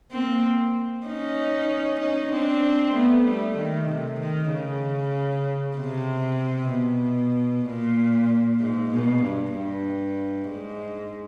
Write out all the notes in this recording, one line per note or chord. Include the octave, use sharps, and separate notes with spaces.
A#3 C4
C#4 D#4
C#4 D#4
C4 D4
A3 B3
G3 A3
D#3
C3
D#3
C#3
C3
B2
A#2
G#2
B2
G2
G2
G#2